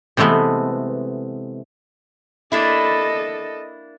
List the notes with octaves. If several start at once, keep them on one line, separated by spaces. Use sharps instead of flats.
C3 E3 G#3 A3 B3
A#3 D4 E4 A4 D#5